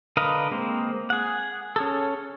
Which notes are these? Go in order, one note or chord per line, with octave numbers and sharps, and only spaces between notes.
D3 A#4 B4 D#5 F5
G#3 A#3 C4
G#4 F#5
C#4 G#4 A4